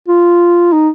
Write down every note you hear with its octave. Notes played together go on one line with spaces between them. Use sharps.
F4
D#4